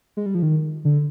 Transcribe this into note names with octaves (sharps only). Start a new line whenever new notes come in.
G#3
G3
F3
D#3
D3